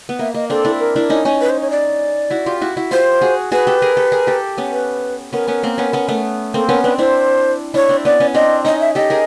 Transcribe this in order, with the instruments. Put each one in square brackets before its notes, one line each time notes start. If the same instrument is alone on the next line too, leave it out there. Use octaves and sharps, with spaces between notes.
[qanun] B3
[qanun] A#3 [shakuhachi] E5
[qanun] A#3 [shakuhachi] D#5
[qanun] C4 D4 [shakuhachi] A4
[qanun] D4 E4
[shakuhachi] A#4
[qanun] D4 E4
C#4 D#4
C#4 D#4
[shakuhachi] B4
C5
C#5
D5
[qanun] E4 F#4
F4 G4
E4 F#4
E4 F#4
[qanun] F4 G4 [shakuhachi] C5
[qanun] F#4 G#4
[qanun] F#4 G#4 [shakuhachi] B4
[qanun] G4 A4
G#4 A#4
G4 A4
G#4 A#4
G4 A4
B3 C#4
[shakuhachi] B4
[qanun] B3 C#4 [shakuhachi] A#4
[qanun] B3 C#4
A#3 C4
B3 C#4
B3 C#4
A3 B3
[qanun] A#3 C4 [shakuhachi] A4
[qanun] B3 C#4 [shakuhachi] A#4
[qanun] C4 D4 [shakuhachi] B4
[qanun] D4 E4 [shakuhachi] C5
[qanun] D4 E4 [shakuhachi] C#5
[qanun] C4 D4
[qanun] B3 C#4 [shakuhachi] D5
[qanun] B3 C#4
[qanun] C4 D4 [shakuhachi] D#5
[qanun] C#4 D#4 [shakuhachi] D#5
[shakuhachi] E5
[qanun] G4 A4 [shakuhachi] D#5
[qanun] G#4 A#4